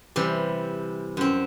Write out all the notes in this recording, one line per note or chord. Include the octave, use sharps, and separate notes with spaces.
C3 E3 G3
F#2 C4